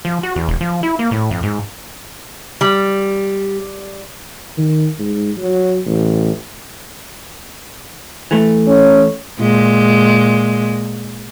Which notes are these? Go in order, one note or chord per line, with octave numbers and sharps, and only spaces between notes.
F3
F#4
E2
E1
F3
E4
A#3
A2
F2
G#2
G3
D#3
G#2
F#3
A1
E3 A3
C#4
A#2 G#3